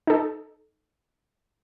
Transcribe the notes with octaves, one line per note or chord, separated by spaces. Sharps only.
D#4 A4